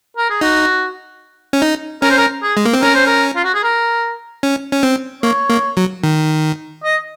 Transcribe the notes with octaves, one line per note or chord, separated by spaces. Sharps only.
A#4
G#4
D#4 F#4
C#4
D#4
C#4 A#4
C5
A#4
G#4
G#3
A#3
C4
C#4 A#4
C5
A#4
F4
F#4
G#4
A#4
C#4
C#4
C4
A#3 C#5
A#3
F#3
D#3
D#5